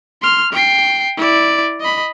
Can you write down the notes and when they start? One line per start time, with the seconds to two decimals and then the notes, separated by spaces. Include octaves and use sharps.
0.22 C6 F6
0.53 G5 C7
1.17 E4 D5
1.80 D#5 B5